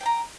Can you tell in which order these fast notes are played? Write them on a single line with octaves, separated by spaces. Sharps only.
G5 A5 A#5